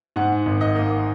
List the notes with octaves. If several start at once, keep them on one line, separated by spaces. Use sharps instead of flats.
G#2 F#5
G#1
D#5
A#3